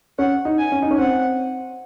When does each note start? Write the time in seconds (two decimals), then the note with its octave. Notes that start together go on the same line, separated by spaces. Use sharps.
0.19 C#4 F#5
0.45 D#4
0.58 G#5
0.72 C#4
0.82 D#4
0.91 C#4
0.98 C4 F#5